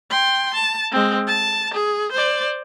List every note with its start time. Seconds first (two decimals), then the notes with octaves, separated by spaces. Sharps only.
0.11 G5 C6
0.54 A5
0.92 G#3 C4
1.28 A5
1.74 G#4
2.12 C5 D5